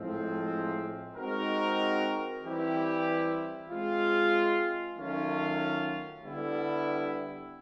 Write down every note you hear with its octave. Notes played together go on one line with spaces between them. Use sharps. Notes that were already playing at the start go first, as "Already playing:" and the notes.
Already playing: A2 F3 G#3 C4
G#3 C4 D#4 F#4 A#4
E3 G3 C4 E4 G4
G#3 C4 F4
D#3 F#3 A3 C#4 F4
D3 G3 B3 E4